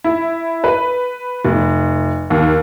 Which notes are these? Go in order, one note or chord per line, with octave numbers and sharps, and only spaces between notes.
E4
B4
F1
D#2